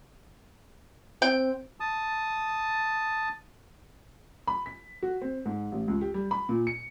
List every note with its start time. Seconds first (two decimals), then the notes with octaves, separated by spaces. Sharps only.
1.22 C4 G5
1.80 A5 D#6
4.47 B5
4.66 B6
5.03 F#4
5.22 C4
5.46 G#2
5.72 A1
5.88 C#2
6.01 G4
6.14 G3
6.31 B5
6.49 A#2
6.67 C#7